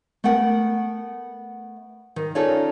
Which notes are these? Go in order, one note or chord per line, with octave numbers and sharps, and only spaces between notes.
A3 B3 A#4 F#5 G5
D#3
C#4 D#4 F4 A4 C#5 D5